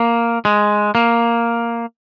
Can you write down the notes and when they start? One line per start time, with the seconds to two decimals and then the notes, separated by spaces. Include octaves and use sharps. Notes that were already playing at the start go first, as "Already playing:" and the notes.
Already playing: A#3
0.45 G#3
0.95 A#3